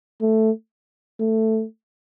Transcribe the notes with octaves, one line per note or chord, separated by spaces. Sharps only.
A3
A3